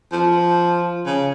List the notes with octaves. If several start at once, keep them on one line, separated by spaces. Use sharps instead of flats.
F3
C#3